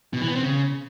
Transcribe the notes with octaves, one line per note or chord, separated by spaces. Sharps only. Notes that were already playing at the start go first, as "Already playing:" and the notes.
B2
E3
B3
C4
C#3